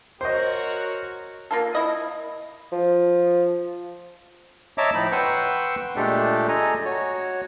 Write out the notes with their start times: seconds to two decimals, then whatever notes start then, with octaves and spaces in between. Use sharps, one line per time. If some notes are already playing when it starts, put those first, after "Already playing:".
0.21 F#4 A#4 C5 C#5 D#5
1.51 A#3 F4 A4
1.75 E4 D#5
2.72 F3
4.78 C#5 D#5 E5 A5 A#5 D6
4.94 A2 F3 D#4 B5
5.12 B4 F#5 G5 C6 C#6 E6
5.96 A#2 G#3 A3 D4 G4 A4
6.49 A4 D#5 G#5 A#5
6.85 F#4 C#5